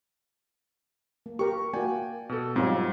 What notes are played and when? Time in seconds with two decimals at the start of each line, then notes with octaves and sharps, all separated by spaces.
1.26 A#3
1.39 G4 A#4 C#6
1.74 A#3 F#4 D5 G5 G#5
2.29 B2 A4
2.56 G#2 F#3 G3 C4 F4 C#5